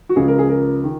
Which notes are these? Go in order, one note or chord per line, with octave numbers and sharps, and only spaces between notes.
F#4
C#2 C#3 F3 G#4
A#4
G#4
A#4
D#3